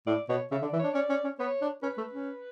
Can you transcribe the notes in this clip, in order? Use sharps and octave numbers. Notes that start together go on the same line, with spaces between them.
A2 D5
B2 C#5
C#3 E5
D3
D5
E3
D4 C#5
C#4 D5
C#4
C#4
B3 C#5
D4
C#4 B4
A3
C#4